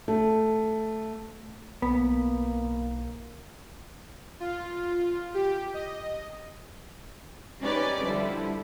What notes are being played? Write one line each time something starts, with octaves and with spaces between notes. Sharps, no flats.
A3
B1 A#3 B3
F4
G4
D#5
C#4 D#4 G4 B4 D5
D3 F3 G3 E4